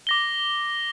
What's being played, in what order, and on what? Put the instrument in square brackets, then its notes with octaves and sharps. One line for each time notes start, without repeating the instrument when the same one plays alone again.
[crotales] D6 A#6 G7